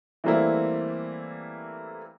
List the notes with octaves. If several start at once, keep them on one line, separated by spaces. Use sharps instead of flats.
E3 G3 A3 A#3 C4 E4